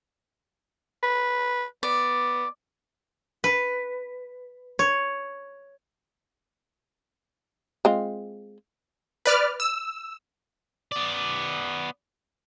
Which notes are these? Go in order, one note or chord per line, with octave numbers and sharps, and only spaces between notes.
B4
B3 D5
B4
C#5
G#3 C4 F4
B4 D5 F6
E6
B3 D5